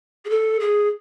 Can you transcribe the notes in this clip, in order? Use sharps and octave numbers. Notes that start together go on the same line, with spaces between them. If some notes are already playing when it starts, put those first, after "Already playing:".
G#4
A4
G#4